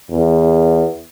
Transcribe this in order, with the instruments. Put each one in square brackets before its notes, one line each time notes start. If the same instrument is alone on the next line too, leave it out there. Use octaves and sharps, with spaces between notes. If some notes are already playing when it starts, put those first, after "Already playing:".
[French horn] E2